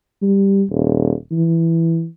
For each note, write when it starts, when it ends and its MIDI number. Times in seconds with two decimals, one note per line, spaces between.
0.22 0.64 55
0.70 1.12 27
1.32 2.07 52